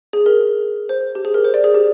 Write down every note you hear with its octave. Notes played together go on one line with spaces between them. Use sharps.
G#4
A#4
C5
G4
G#4
A#4
C5
D5
G#4
G4